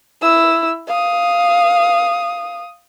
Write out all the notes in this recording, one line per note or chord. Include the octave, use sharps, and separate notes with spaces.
E4 E6
F5 D#6